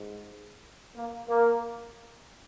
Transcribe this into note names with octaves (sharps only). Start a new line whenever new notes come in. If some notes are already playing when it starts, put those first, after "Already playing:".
Already playing: G#2
A#3
A#3